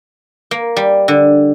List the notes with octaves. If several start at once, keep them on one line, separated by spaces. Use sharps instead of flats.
A#3
G3
D3